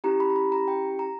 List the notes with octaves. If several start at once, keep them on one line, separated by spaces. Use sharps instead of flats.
C#4 E4 G4 A#5
B5
A#5
B5
A#5
G5
A#5